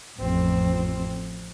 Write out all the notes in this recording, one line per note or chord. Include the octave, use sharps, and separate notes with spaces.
A1 F2 C4